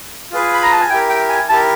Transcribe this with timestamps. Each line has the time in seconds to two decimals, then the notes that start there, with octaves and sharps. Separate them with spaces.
0.32 F4 G#4 B4
0.54 B5
0.63 A#5
0.72 A5
0.81 G#5
0.90 E4 G4 A#4 G5
1.09 G5
1.29 G#5
1.49 E4 G4 A#4 A5